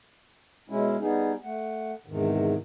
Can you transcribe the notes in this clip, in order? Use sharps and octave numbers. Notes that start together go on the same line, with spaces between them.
B2 G#3 C#4 E4
G3 B3 D#4 G#4
A3 F#5
E2 G#2 C3 D#3